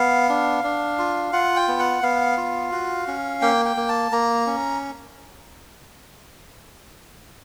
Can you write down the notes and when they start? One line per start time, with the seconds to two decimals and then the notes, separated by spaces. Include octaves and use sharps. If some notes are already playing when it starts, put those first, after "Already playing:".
Already playing: B3 F5
0.29 D4
0.64 D4
0.98 F4
1.33 F4 F#5
1.56 G5
1.68 B3
1.79 F#5
2.02 B3 F5
2.37 F4
2.72 F#4
3.07 C#4
3.42 A#3 G5
3.65 G5
3.77 A#3
3.89 A5
4.12 A#3 A#5
4.47 C#4